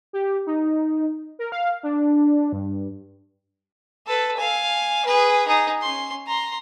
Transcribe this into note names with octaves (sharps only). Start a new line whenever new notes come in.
G4
D#4
A#4
F5
D4
G2
A4 B4
F5 G#5
G#4 B4
D#4 G#4
C#4 C6
A#5 C6